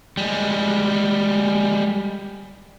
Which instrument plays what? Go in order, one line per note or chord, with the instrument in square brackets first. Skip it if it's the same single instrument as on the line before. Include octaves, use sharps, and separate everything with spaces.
[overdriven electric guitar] G3 G#3